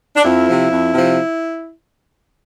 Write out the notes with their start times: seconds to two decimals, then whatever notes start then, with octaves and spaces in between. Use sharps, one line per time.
0.16 D4
0.24 F2 E4
0.47 C3 F3
0.71 F2
0.94 C3 F3